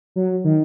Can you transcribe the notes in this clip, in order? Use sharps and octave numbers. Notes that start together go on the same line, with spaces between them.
F#3
D#3